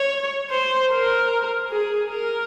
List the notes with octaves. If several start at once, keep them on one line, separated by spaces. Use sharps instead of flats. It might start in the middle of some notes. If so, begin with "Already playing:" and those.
Already playing: C#5
C5
A#4
G#4
A#4